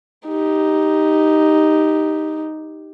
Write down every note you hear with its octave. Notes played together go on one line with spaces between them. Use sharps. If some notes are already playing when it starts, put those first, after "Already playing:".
D#4 G4